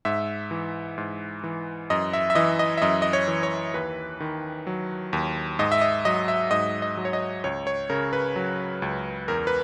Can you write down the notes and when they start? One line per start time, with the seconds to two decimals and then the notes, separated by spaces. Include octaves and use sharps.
0.05 G#2 E5
0.51 E3
0.98 G#2
1.44 E3
1.90 F#2 D#5
2.13 E5
2.30 E5
2.35 E3 D#5
2.59 D#5
2.77 E5
2.82 F#2 D#5
3.02 D#5
3.13 C#5
3.28 E3
3.43 C#5
3.74 D#2 B4
4.20 D#3
4.67 F#3
5.13 D#2
5.59 G#2 D#5
5.72 E5
5.81 D#5
6.05 F#3 D#5
6.28 E5
6.51 G#2 D#5
6.82 D#5
6.97 F#3
7.05 C#5
7.13 D#5
7.44 C#2 C#5
7.67 C#5
7.90 C#3 A#4
8.13 B4
8.36 F#3
8.82 C#2
9.28 E2 A#4
9.47 B4